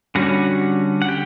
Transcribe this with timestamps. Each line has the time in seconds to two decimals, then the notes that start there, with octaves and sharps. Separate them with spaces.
0.15 D3 G3 C#4 F#4 F#5
1.02 F#5
1.08 G4 G5